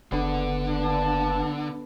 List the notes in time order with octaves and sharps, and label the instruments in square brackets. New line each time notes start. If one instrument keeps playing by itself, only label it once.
[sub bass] F#1 [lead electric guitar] D3 [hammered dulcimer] B3 D4 A4
[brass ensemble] A#3 B4 A5